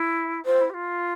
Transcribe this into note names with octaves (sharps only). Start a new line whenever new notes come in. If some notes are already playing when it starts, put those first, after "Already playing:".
Already playing: E4
F4 C5
E4
G4
F4